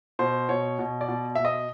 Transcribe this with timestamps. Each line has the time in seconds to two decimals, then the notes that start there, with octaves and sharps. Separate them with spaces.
0.19 B2 C5
0.49 B2 C#5
0.79 B2
1.01 D5
1.08 B2
1.35 B2 E5
1.45 D#5